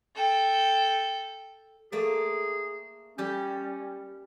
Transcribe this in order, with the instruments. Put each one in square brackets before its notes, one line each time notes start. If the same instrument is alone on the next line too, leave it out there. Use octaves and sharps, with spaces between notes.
[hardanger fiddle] A4 G5
[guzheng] A3 A#3 D5 [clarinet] G#4
[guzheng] G3 G4 [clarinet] C#4